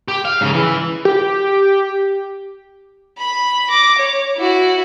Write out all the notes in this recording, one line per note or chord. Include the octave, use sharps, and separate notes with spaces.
G4
F5
G#2 C#3
E3
G4
B5
D6 A#6
C#5
E4 F#4